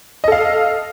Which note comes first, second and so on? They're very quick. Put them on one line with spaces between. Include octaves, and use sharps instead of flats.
D#5 A4 F5